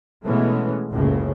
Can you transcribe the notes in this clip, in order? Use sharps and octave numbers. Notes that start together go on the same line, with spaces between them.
B2 E3 G#3 A3 B3 C#4
F#1 C#2 A2 C#3